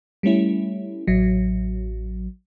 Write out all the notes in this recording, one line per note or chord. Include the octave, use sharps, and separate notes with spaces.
G3 A3 C#4 E4
A1 F#3